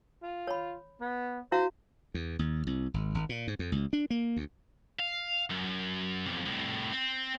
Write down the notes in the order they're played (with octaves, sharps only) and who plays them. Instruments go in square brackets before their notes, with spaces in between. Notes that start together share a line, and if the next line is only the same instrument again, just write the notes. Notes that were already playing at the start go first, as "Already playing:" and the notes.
[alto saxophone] F4
[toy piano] C#5 B5
[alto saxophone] B3
[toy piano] E4 F#4 F5 [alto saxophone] C5
[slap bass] E2
D#2
C2
G#1
G#1
A#2
G#2
F2
C#2
D4
A#3
D2
[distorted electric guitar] F5
F#2
B1 F2
C2 A2
C4